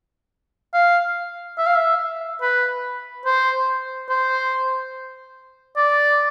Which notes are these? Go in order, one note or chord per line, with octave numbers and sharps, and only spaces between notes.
F5
E5
F5
E5
B4
C5
C5
D5